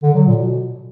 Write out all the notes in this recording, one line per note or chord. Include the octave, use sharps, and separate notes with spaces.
D3
F#3
A#2
B2